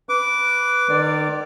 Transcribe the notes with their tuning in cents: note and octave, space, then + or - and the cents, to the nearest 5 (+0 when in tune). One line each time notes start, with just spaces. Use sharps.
B4 +0 D6 -15
D#3 -35 D5 +0